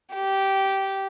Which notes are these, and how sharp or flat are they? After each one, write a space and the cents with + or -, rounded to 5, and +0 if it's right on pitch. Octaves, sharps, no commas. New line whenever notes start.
G4 -15